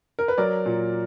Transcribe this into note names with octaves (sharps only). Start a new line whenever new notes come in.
A#4
B4
F#3 A#4 D5
A#2